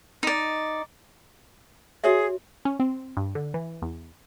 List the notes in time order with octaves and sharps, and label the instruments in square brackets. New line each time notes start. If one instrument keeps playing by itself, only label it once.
[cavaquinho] D#4 D5
[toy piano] F#4 C#5 E5 [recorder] G#4
[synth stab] C#4
C4
G2
D3
E3
E2